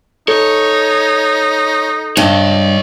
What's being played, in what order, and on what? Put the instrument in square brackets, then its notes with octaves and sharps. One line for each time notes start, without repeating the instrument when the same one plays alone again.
[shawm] D#4 [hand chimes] A4 [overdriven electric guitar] C#5
[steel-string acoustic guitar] G2 [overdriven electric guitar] C#5 D#5